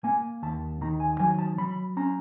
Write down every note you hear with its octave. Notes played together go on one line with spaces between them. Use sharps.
A#3 G#5
D#2 A5
D#3 A#5
G#5
F#3 G#5
A5
F#3 B5
C#4 A#5